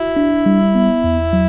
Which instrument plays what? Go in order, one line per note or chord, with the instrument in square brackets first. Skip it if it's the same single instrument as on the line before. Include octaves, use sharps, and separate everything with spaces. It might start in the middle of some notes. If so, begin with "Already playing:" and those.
Already playing: [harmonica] E4 [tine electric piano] F#4
[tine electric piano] D4
G3
B3
E2
F#3